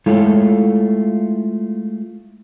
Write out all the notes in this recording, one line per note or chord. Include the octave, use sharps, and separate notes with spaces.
G#3 A3 E4 F4 A4 C#5